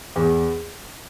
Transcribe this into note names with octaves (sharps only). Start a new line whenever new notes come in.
E2